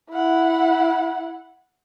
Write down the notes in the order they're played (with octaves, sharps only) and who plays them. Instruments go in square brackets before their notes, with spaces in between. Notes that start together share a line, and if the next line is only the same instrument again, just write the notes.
[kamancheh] E4 F#5